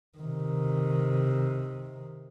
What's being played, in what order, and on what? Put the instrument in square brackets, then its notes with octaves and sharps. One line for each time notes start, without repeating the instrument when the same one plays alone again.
[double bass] C3 D#3